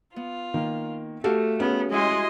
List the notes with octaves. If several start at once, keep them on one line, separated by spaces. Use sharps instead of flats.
B3 F4
D#3 A#3
A3 F#4 G4 A4 F5
B3 C#4 G#4
G#3 E4 F#4 D#5 C6